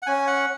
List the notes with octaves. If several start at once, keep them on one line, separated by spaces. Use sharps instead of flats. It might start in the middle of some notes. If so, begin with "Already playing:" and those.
F#5
C#4 G#5
F#5